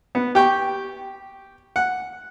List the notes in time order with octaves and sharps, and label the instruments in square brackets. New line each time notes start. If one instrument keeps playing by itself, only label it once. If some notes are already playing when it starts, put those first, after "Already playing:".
[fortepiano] B3
G4 G5 C#6
F#5